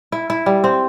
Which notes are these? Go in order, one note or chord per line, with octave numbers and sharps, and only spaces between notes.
E4
E4
G3
C4